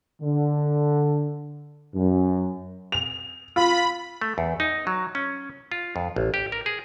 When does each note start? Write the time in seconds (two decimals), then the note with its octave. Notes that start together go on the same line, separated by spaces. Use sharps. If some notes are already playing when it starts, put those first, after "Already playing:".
0.22 D3
1.95 F#2
2.92 F7
3.56 F4 B5
4.21 A3
4.38 E2
4.60 D#4
4.87 F#3
5.15 C#4
5.72 F4
5.96 F2
6.16 A1
6.34 G4
6.52 A#4
6.66 G#4